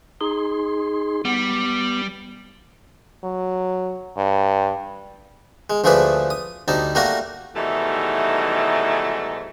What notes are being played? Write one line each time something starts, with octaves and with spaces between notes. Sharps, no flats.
D#4 G#4 C6
G3 B3
F#3
G2
G#3
D2 F3 A3 G#4 B4 D5
D#6
D2 G3 D#4 A5
G3 A3 A#3 F#4 A#4 A#5
G#2 B2 D#3 E3 G3 A3